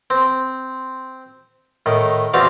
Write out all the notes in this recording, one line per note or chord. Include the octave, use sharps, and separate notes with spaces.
C4
A2 D#3
E2 C4 D4 F#4 F5